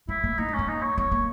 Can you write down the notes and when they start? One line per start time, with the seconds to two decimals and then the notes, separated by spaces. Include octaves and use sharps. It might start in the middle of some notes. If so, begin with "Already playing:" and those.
0.09 A#3 E4
0.24 A#3
0.38 A#3 D#4
0.48 G#3
0.53 C#4
0.59 A#3
0.68 D#4
0.82 C#5
0.98 B3 C#5
1.12 A#3